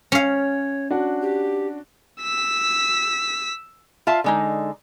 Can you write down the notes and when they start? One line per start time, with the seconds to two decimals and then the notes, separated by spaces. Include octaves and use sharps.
0.12 C#4 C#5 F5
0.91 D4 F#4
1.21 G4
2.21 E6 B6
4.07 F4 E5 F5 A5
4.24 D3 G#3 D#4